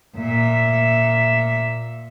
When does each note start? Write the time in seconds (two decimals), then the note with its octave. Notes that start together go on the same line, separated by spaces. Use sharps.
0.16 A#2 E5